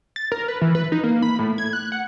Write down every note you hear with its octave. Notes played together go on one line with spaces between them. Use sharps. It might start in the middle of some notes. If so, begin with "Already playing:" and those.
A6
A#4
B4
E3
B4
D#4
A#3
B5
A2
G#6
F#6
F#5